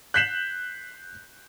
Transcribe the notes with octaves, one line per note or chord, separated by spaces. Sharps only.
F#6 G6 B6 C7 E7 F#7